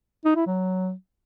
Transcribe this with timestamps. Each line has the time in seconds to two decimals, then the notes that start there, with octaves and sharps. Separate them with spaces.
0.25 D#4
0.36 E4
0.47 F#3